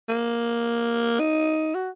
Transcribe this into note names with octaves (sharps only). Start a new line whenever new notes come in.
A#3
D#4
F#4